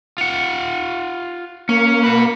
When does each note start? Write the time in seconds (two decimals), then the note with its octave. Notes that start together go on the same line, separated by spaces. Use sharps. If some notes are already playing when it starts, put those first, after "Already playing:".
0.18 F4 F#5
1.69 A#3 C#4
2.04 F#4 B4